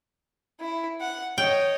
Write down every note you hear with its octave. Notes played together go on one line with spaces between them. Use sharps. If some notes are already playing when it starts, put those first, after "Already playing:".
E4
F#5
C#5 D#5 G5